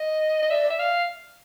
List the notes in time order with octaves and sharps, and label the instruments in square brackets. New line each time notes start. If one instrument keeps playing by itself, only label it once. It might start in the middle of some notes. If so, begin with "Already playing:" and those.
Already playing: [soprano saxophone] D#5
D#5
[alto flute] D5 [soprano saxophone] E5
[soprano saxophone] E5
F5